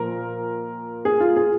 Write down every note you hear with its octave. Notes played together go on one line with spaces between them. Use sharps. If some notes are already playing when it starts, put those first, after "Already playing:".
Already playing: A#2 F3 A#4
G#4
F4
G#4